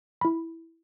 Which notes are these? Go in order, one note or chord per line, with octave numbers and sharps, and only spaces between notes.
E4 B5